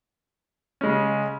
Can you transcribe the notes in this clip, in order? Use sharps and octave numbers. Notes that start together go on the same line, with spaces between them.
C#3 G#3 C#4